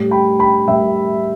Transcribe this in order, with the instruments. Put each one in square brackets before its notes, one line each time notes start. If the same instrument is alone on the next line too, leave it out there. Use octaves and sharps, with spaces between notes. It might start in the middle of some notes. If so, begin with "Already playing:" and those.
Already playing: [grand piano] A2 G3
G5 B5
G5 B5
A2 G3 E5 G5